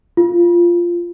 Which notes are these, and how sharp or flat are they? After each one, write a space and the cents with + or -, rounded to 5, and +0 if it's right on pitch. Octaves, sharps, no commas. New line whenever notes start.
F4 -10